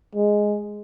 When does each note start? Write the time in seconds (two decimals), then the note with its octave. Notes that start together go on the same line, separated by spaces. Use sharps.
0.15 G#3